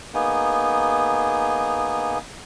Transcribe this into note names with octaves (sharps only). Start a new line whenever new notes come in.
A#3 B3 D#4 G#4